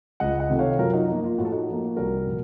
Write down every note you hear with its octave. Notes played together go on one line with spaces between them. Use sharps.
C#2 D#5 F#5
D#5 F#5
C3 D#3 A3
C#5 F5
F#2 F#4 A#4
D#4 F#4
F3 A#3 D#4
F4
A2 F#4
A4
D#4 F#4
F3
A#3
C2 F#4 A#4
A#2 F3